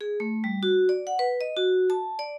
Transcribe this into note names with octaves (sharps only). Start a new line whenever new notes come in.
G#4
A3
G3
F#4
D5
F#5
B4
D#5
F#4
A5
D5